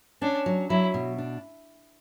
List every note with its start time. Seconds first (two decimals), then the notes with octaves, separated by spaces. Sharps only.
0.22 C#4 D4
0.46 F#3
0.70 F#3 E4
0.94 B2
1.18 D4